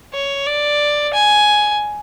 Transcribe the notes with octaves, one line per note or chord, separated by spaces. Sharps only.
C#5
D5
G#5